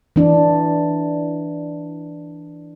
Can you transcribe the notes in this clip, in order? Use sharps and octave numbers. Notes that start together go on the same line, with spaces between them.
E3 D4